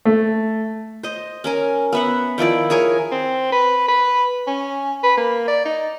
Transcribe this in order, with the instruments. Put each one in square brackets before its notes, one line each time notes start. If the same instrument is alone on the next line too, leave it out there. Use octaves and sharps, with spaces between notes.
[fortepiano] A3
[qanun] C5 D#5
C#4 A#4 G#5
B3 E5 F#5
D#3 F3 E4 D5
G#4 A#4 C#5 G#5
[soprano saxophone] C4
B4
B4
C#4
B4
A#3
D5
D#4